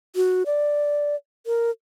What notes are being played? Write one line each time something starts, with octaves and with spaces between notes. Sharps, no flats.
F#4
D5
A#4